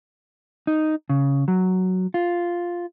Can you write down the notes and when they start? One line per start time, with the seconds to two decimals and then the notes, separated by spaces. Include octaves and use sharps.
0.67 D#4
1.10 C#3
1.48 F#3
2.14 F4